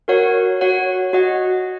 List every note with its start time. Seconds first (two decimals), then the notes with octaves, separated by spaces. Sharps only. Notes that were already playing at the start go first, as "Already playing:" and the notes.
0.08 F#4 A#4 C#5 F#5
0.61 F#4 C#5 F#5
1.13 F#4 D#5 F#5